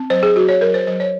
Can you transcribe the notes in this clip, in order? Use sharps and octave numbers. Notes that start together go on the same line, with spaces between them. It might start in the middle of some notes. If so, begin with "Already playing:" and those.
Already playing: C4
F#3 C5
G#4
F#3 F#4
C#5
F#3 A#4
C5
F#3 C5
C#5